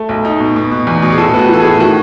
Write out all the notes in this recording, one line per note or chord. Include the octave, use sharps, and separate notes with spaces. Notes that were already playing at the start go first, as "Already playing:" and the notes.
Already playing: A3
B1
D#4
B2
B2
B2
E2
B2
G#4
A2 A4
B3
F#4
E3 A4
A2 G#4
D#3 F#4